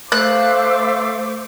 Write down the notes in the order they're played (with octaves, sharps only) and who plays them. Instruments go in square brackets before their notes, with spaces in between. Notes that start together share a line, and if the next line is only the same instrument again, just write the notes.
[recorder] A3 [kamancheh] C5 D6 [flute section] F5 E6 [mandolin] F#6